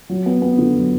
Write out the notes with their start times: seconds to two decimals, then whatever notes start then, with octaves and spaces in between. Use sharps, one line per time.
0.09 F#3
0.26 B3
0.42 B3
0.58 D3
0.76 F#3